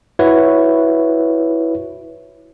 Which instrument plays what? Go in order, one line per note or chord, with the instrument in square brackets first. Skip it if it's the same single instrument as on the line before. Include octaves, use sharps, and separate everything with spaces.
[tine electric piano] E4 F#4 B4 C#5